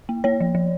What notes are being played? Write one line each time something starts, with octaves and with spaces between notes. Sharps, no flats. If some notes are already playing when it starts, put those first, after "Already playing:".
A#3
A#3 C#5
F3
F3